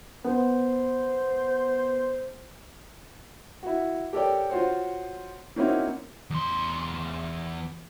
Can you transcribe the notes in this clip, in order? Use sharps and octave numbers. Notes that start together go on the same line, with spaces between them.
B3 C5
E4 F#4
G4 A4 A#4 C#5 D5 G5
F4 F#4 C5 C#5
A#3 C4 C#4 D#4 E4 F#4
E2 C6